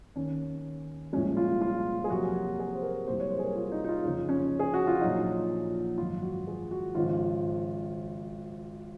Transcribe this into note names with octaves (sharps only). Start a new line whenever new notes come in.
D#2 D#3 A#3 C#4
C2 A#2 F3 G#3 C#4
F4
F4
G#4
F2 C3 F#3 A#3 F#4
G#4
C5
A#4
C2 C3 F#3 A#3 C5
C#5
C5
G#4
A#4
F4
D#4
D#4
F4
F1 F2 C#3 D#4
C#4
G#4
F#4
F4
A#1 A#2 F#3 D#4
G#1 F#2 F3 F4
F#4
G#4
F#4
G#1 C#3 F3 F4